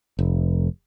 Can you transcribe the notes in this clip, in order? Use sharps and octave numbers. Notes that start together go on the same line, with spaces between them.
F1